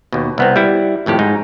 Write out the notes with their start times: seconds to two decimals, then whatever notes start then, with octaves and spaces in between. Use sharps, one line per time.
0.13 D#2 B2
0.38 C2 B3 C4
0.56 G3 E4
1.06 G#1 F2 A2 G4
1.19 G#2 D#4